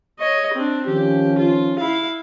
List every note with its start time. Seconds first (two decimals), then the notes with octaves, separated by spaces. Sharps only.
0.19 C#5 D#5
0.55 C4 D4
0.87 D#3 F3 C#4 G4
1.39 F4
1.79 E4 F5